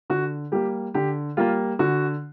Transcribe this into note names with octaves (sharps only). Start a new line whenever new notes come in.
D3 F#4
G3 A#3 G4
D3 G4
G3 A#3 F4
D3 F#4